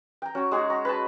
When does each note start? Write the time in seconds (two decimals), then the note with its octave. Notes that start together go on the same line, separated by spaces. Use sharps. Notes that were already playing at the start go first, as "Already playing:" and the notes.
0.22 G5 A#5
0.35 C#4 F#4
0.51 G#3 D#4 F#4 G#4
0.70 A#5
0.85 B4 A5